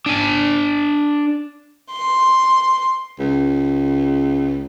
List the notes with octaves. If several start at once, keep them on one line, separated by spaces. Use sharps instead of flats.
D4 G#5
C6
C#2